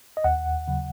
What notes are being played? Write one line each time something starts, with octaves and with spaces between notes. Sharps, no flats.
D#5
D#2 F#5
C#3 F#3